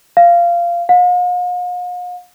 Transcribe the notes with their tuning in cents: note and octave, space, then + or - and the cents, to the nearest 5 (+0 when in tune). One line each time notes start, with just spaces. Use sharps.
F5 -15
F5 +45